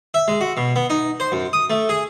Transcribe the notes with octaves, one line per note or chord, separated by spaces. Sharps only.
E5
G#3
F#4
B2
B3
D#4
C5
F#2
D#6
A3
G#4